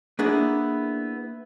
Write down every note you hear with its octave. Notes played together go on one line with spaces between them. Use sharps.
A#3 B3 D4 E4 G#4